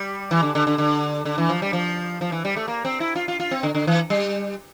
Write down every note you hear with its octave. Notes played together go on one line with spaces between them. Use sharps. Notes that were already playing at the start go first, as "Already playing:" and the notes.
Already playing: G3
E3
D3
D3
D3
D3
D3
E3
F3
G3
F3
F3
E3
G3
A3
A#3
C4
E4
F4
F4
F4
C4
D3
D3
E3
G3